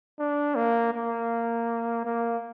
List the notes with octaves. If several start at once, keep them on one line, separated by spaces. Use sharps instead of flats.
D4
A#3
A#3
A#3